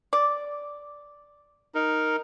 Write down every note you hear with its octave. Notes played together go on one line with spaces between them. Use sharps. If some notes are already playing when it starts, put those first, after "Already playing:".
D5
D#4 A#4